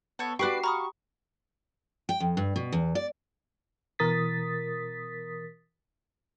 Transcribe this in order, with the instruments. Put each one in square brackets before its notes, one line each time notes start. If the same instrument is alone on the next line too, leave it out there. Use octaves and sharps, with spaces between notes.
[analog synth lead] B3 [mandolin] A4 C#5
[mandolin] D4 B4 D6 [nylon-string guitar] F#4 G4 [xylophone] C#6 [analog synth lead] C7
[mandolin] F5 [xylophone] A#5 B5 D#6 [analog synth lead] C#6
[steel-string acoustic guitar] G5
F2
G2
B2
E2
D5
[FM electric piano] B2 E3 A#4 D#6 A6 B6